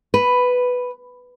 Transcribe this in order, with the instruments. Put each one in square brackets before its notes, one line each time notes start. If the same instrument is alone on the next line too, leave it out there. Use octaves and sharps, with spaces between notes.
[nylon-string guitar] B4